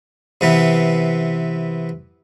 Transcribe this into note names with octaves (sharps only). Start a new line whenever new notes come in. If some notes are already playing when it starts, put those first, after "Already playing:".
C3 E3 B3